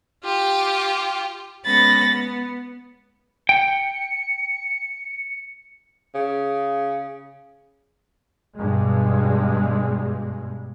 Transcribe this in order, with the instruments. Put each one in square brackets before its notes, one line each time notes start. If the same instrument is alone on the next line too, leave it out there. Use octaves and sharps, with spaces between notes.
[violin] F4 G4
[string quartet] G#3 B3 C#4 B5 A6 A#6
B3
[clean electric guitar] G5 [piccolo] C#7
[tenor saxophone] C#3
[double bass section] G2 B2 G#3